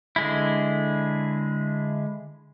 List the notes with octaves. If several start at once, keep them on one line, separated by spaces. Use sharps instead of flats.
D3 G#3 E4